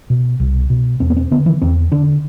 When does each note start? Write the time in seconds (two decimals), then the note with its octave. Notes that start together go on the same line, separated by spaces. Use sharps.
0.10 B2
0.40 C2
0.70 B2
1.00 E2 C4
1.10 B3
1.17 C4
1.31 D3 B3
1.46 E3
1.62 E2 C4
1.92 D3 D4